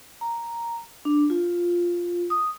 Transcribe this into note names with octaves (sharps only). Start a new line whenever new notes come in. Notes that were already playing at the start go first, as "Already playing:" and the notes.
A#5
D4
F4
D#6